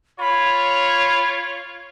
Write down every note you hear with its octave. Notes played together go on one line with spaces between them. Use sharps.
F4 C#5 B5